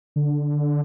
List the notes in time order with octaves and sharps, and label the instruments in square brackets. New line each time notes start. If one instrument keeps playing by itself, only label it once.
[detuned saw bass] D3